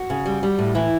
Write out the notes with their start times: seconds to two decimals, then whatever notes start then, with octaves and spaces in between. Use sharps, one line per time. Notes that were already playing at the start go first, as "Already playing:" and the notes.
Already playing: F#4
0.10 C#3
0.26 G3
0.43 G3
0.58 A2
0.75 E3 E4